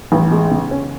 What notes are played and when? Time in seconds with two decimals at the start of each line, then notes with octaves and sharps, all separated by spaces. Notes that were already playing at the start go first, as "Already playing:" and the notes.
0.12 A1
0.31 G#3
0.51 C#3
0.71 C#4